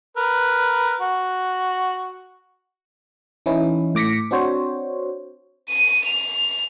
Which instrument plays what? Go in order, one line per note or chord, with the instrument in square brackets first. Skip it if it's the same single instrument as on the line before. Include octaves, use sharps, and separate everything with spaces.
[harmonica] A#4 B4
F#4
[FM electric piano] E3 C#4 D#4 E4
A2 D6 A#6 B6 C#7
C4 D4 F#4 C5 C#5
[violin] D#7
F7